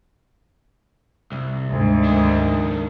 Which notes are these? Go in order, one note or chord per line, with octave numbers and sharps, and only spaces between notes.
C2
D2 G#2
D#3 D4